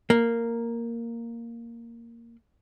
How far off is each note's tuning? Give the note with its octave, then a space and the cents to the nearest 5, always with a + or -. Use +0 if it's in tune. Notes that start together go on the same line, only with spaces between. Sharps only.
A#3 -5